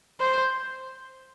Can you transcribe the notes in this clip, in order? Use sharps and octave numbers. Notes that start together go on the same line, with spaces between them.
C5